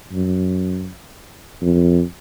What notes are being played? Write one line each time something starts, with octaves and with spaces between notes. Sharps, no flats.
F#2
F2